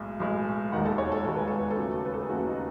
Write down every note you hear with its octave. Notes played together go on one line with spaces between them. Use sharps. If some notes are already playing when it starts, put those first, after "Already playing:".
Already playing: B1 A2 G#3
B1 A2 G#3
E1 D#2 D#3 G#3 F#5
A4
C#5
A4
E1 D#2 D#3 G#3 A4
B4
A4
B4
A4
D#2 C#3 F#3 A3
B4
A4
G#4
D#2 C#3 F#3 A3 F#4
D#4